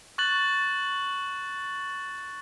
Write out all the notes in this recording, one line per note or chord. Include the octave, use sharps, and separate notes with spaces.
C#6 F#6 A6 F#7